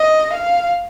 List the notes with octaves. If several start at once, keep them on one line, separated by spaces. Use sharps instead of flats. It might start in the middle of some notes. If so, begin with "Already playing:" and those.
Already playing: D#5
F5